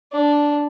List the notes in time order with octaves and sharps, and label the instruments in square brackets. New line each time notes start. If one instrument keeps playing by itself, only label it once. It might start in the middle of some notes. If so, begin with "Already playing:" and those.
[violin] D4